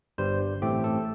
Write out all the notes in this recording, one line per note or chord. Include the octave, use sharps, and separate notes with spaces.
G1 G2 G3 C5
A1 A2 A3 C4 G4
A4